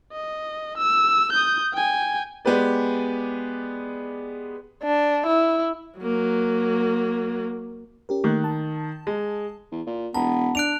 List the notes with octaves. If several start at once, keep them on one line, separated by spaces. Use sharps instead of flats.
D#5
E6
D#6 G6
G5 G#5
G#3 B3 G4 B4 D5
D4
E4
F#3 A#3
C#4 G4 A#4
D#3 A3 A#3 F#6
A5
G#3
E2
A#2
E1 B3 A5 A#5
D4 F#6 D7 F7